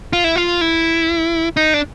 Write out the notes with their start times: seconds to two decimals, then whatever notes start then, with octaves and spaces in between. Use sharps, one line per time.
0.13 F4
0.24 E4
0.36 F4
0.61 E4
1.57 D#4
1.74 D4